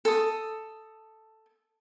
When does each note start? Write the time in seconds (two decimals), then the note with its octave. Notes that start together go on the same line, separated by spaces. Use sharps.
0.05 A4 D#6